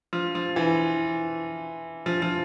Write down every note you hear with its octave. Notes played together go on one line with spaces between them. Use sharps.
F3
F3
E3
F3
F3